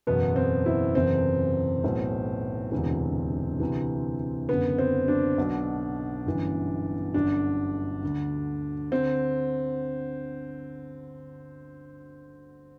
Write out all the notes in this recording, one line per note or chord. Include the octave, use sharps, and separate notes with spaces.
F#1 E2 B2 B3
C4
E4
F#1 E2 C3 E3 C4
B1 A2 E3
E1 D2 C3 E3
D2 C3 E3
F#1 F#2 D3 B3
C4
D4
B1 B2
G1 F#2 E3
G1 F#2 D3 D4
D2 D3
D3 C4